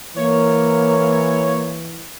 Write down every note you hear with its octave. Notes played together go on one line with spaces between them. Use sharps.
E3 A#3 C#5